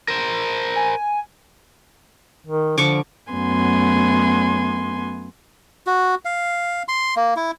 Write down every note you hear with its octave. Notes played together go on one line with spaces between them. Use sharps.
A#4 C5
G#5
D#3
D3 F3 C#6 D6
F#2 A3 B3 G#5 C6
F#4
F5
C6
A#3
E4